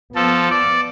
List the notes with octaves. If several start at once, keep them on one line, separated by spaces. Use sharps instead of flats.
F3 B3 A4
D5